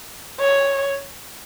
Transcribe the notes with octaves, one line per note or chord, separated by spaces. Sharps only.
C#5